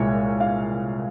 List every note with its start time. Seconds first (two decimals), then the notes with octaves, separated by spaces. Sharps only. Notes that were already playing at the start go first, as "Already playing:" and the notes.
Already playing: C2 A#2 G#3 C#5
0.40 F5